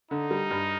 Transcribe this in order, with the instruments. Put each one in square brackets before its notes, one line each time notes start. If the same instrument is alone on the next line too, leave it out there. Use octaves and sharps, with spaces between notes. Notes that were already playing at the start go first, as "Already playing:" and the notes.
[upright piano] D3 [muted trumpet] D#4
[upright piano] G3
G2